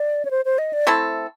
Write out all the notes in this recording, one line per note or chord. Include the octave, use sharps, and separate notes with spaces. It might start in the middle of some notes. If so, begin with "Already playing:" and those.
Already playing: D5
C#5
C5
C5
D#5
D5
A3 C4 E4 A4